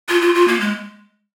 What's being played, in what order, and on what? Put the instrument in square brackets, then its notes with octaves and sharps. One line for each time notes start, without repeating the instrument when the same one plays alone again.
[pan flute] F4
F4
F4
A#3
G#3